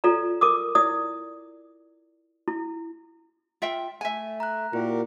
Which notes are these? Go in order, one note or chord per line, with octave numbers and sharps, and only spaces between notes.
F4 A4 D5 A#5
A#4 D6 D#6
E4 D5 D#6
E4
F4 E5 G5
A3 E5 G#5
A#5 F#6
A#2 E4 F#4 G4 A#4